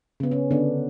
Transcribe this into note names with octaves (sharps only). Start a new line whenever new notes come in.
C#3 B3
C#4
D3 B3 D4